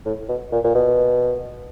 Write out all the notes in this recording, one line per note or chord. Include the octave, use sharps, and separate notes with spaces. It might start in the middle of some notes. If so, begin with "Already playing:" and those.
A2
B2
A#2
A#2
B2